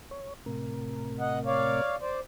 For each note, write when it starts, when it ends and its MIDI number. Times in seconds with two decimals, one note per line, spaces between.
0.11 0.34 73
0.46 1.82 45
0.46 1.82 48
0.46 1.82 70
1.20 1.39 75
1.20 1.39 78
1.46 1.96 73
1.46 1.96 74
1.46 1.96 77
2.01 2.20 72
2.01 2.20 74